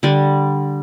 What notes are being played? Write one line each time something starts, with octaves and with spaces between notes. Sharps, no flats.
D3 G3